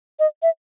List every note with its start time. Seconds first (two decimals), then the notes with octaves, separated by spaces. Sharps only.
0.19 D#5
0.42 E5